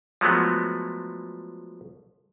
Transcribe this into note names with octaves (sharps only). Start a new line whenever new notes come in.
F3 F#3 G#3 A3 B3